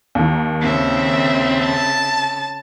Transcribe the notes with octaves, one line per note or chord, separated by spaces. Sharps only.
D#2 D#3
C#3 C4 E5
A5